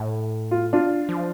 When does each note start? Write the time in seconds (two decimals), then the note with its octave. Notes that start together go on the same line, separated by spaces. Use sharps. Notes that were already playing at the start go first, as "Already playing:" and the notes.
Already playing: A2
0.51 F4
0.73 D4 F4
1.09 F3